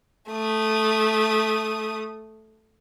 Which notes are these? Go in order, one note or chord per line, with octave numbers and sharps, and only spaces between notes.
A3 D#6